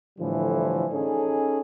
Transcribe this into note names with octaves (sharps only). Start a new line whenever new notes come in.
A2 D3 E3 F3 G3
C#4 D#4 G#4 A4